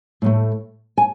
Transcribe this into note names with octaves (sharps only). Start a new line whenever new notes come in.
A2 F3 A3
G#5